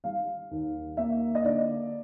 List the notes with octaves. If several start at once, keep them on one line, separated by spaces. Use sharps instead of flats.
G3 F5
D#2
A#3 E5
D#5
D3 D5